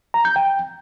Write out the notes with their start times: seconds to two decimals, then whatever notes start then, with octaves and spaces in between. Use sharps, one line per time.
0.14 A#5
0.25 G6
0.36 G5